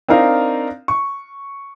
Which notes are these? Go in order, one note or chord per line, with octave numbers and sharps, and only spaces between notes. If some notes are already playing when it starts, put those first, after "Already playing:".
C4 D4 D#4 A#4 F5
C#6